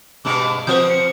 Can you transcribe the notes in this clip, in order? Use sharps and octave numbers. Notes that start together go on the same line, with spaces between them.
G2 B2 G#3 D6
F3 C4 F#4 B4 C5 D#6 G6
C#7